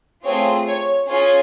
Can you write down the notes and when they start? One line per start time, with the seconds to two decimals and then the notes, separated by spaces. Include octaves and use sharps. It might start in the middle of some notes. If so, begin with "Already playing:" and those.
0.24 A3 C4 F4 G#4 C#5
0.67 C#5
1.07 C#4 F4 G#4 C#5